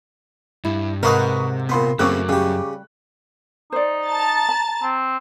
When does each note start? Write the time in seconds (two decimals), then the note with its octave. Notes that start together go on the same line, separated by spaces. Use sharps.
0.65 G2 E4
1.03 G#2 C3 A#4 B4 F5 F#5 C#6 D#6
1.69 A#2 B3 B5 C6
1.99 F#2 C#3 A3 A#3 C4 C#6 D6 F#6
2.29 C#3 G3 G4
3.72 D#4 C5 D5
4.07 A5 A#5 A6
4.49 B5
4.82 C4